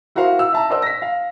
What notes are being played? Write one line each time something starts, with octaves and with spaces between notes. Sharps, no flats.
E4 F#4 A#4 C5 F5
E6
E5 A5 A#5
A#4 C5 D5 D#5 F#5 E6
A#6 B6
F5